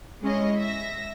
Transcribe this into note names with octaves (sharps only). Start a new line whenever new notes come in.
G#3 C#4 E4 C#5 D#5
E5 A#6